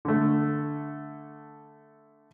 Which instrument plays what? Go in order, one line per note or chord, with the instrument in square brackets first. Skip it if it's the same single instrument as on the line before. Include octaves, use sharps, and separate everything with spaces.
[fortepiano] D3 A3